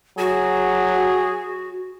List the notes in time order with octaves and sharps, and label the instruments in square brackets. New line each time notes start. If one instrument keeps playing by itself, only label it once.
[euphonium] F#3 [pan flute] F#4 [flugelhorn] G#4